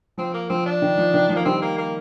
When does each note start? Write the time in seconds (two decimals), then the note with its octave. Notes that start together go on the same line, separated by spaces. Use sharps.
0.18 F3 C4
0.34 A#3
0.49 F3 C4
0.66 D4
0.82 D#3
0.98 F3
1.14 D#3
1.29 F3
1.36 A#3
1.45 D#3 G3 C4
1.62 A#3
1.78 A#3